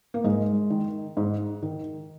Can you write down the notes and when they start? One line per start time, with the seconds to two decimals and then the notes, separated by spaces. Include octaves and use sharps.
0.14 A#3
0.24 G#2 G#3
0.70 D#3
1.17 G#2
1.62 D#3